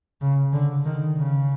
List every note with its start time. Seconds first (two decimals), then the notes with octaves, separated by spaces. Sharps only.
0.21 C#3
0.53 D3
0.86 D#3
1.17 C#3